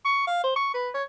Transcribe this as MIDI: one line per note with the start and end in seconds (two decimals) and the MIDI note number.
0.05 0.27 85
0.27 0.44 77
0.44 0.53 72
0.56 0.72 85
0.74 0.89 71
0.94 1.03 73